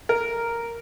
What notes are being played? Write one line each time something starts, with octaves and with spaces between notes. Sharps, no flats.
A#4